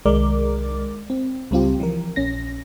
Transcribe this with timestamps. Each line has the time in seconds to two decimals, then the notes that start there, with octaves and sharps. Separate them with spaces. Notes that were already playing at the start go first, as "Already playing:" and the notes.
0.06 C2 D#3 G#3 A#4 D5 D6
1.10 C4
1.51 C#2 G3 C4 F4 G4
1.80 E3 F3 A#4
2.16 A#1 C#4 A#6